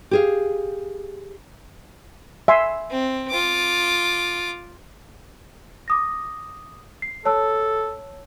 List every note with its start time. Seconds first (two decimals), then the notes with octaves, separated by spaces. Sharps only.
0.11 G4 G#4 F5
2.48 E5 G#5 C6
2.90 C4
3.30 F4 D6
5.88 D6 D#6 A#6
7.02 C7
7.25 A4 C#5 A5 E6